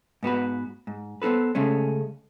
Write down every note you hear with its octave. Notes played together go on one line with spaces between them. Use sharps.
G#2 B3 F#4 B4
G#2
B3 C4 F4 A4 B4
C#3 G#3 A3 C#4